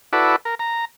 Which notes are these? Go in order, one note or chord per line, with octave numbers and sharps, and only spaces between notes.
E4 F#4 A4 B4 D5
A#4
A#5